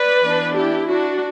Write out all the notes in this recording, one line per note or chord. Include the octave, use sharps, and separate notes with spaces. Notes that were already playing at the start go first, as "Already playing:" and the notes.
Already playing: B4 D5
E3 B3 D4
E4 G4
D4 F#4